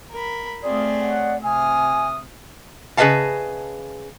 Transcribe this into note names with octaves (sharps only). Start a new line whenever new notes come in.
A#4 B5
A3 C4 F4 G#4 D5 D#6
C#5 D#5 F#5
C3 E5 G#5 D#6 F6
C#3 G#4 B4 D#5 F5 A5